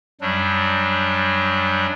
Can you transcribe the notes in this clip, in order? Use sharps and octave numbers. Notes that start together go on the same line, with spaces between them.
F#2 F#3 G3 D4